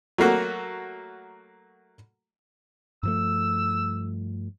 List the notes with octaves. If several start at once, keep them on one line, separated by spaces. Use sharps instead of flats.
F#3 A3 A#3 F#4
G2 F3 A3 E6